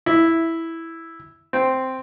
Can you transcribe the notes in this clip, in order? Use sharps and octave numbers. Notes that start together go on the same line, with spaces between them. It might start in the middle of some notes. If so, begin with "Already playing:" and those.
E4
C4